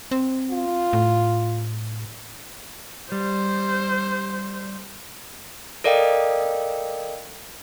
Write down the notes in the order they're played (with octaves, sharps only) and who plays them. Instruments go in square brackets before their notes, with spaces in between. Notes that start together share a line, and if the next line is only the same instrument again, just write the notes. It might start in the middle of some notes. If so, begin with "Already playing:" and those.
[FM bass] C4
[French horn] F4
[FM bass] A2
[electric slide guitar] G3 [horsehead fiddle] C5
[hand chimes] A4 A#4 D5 D#5 F5 G5